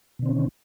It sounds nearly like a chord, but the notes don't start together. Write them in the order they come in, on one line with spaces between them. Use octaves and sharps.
B2 D3 C4 C#4 D#3